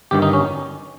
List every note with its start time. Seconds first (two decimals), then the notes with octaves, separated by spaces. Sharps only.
0.11 G1 G2 D#3 G4
0.22 D#4
0.33 C#4